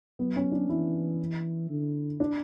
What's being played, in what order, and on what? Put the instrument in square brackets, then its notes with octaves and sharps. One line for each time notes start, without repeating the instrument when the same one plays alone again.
[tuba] F#3 [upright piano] B3
[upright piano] C#4
D4
[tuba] E3 [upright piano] E4
[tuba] D3
[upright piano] D4